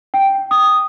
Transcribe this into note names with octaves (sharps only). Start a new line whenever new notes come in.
G5
D#6